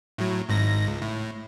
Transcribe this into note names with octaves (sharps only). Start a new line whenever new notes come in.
A2 F#3
G#1 G#2 A#6
C#2
A2